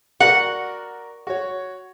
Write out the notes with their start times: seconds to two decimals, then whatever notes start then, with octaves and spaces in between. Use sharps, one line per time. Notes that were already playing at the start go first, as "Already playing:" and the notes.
0.20 F#4 A#4 D5 F#5
1.27 F#4 C#5